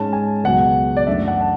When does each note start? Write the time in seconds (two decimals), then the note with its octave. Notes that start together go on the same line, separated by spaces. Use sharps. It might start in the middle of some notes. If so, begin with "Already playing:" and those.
Already playing: G#2 G#3 C#4 A5
0.13 G#5
0.44 C#2 B2 F#3 F#5
0.97 D5
1.07 F#2 E3 A3 D4 E5
1.28 F#5
1.41 A5